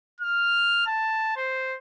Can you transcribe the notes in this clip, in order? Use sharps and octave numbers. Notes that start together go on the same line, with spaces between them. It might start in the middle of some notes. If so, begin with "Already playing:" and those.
F6
A5
C5